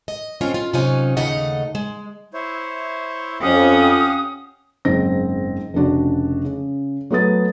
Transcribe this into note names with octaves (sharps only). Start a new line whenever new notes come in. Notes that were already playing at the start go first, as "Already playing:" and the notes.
D#5
C4 C#4 F4 A4
F4
C3 F#3 C#4 D#4 F4 G#5
D#2 C#3 A3 D#4 D#5 F#5
G#3
E4 C5 C#5
F2 C#4 G4 F5 F#5 D#6
F#1 G#2 C4 A#6
F1 C#3 D4 F#4
C#3
F#3 A3 B3 D#6 A6